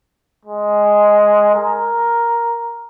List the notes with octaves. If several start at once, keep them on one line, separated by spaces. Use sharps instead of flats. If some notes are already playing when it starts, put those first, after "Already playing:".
G#3
A#4